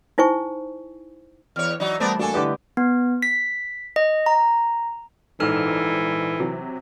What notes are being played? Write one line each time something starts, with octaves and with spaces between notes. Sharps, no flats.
D#4 E4 C5 G#5 C#6
E2 C#5 F6
E3 F#3 D#4 D5
G3 A3 B3 A#4 C5 D5 A5
A#3 D4 F#4 A4 G#5
D3 E4 G4 B4 D#5 G5 D6
B3
B6
D#5
A#5
A#1 G#2 E3 D#4 A4 F6 E7
C3 F#3